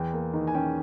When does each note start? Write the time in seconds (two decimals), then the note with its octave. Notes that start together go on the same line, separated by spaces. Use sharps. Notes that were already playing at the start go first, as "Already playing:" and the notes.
Already playing: E2 G5
0.13 A#3
0.33 D#3
0.47 G#5
0.55 C#4 G5